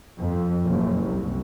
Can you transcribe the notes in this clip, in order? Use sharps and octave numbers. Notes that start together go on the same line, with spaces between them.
F2
F#1
C2